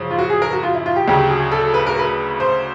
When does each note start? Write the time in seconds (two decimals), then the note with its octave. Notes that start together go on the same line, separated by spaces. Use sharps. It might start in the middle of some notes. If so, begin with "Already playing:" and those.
Already playing: F#2 C#3 F3
0.11 F4
0.18 F#4
0.30 G#4
0.42 A#4
0.53 F#4
0.63 F4
0.75 E4
0.86 F4
0.96 G4
1.08 D2 C#3 F#3 G4
1.30 G#4
1.52 A4
1.74 B4
1.87 A#4
1.99 B4
2.40 C5